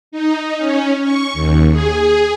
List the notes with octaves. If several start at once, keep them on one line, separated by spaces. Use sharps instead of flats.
D#4
C#4
C#6
D#2
G#4